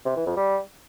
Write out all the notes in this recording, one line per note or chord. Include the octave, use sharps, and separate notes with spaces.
C3
E3
F2
G3